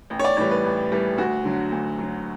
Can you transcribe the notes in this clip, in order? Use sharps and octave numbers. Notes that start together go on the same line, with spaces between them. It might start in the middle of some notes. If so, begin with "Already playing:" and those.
A1
C#5
D5
A2 E3 G3 C#5
B4
A1
A2 E3 G3
D2 F#4
D3 F#3
D2
D3 F#3